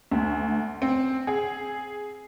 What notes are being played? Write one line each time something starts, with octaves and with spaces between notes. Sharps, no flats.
D2
C4
G#4